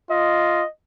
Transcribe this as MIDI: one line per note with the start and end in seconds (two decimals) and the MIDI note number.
0.11 0.63 65
0.11 0.69 75